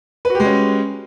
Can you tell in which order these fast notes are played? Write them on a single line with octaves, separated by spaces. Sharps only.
B4 F#4 G4 G#3 C#4